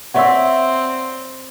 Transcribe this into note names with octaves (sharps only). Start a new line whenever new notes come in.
C4 C#5 D5 E5 F#5 C#6 E6